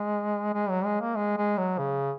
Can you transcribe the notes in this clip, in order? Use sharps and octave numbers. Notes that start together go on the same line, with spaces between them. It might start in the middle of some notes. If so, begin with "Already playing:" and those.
Already playing: G#3
G#3
F#3
G#3
A#3
G#3
G#3
F#3
C#3